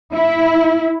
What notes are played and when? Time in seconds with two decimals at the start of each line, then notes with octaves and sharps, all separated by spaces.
0.13 E4